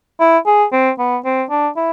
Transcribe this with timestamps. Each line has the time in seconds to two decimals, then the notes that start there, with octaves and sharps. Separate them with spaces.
0.20 E4
0.47 G#4
0.72 C4
0.99 B3
1.25 C4
1.50 D4
1.77 E4